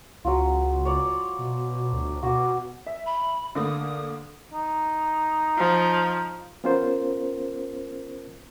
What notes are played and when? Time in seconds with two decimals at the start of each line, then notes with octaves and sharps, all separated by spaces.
0.25 C#2 F#3 F4
0.85 C#5 D5
1.39 B2
1.93 D2
2.23 B2 F#4 D6
2.87 E5
3.06 B5
3.55 D3 A3 A#3 D#6
4.53 D#4
5.58 F3
6.64 B3 C#4 F4 A#4 C5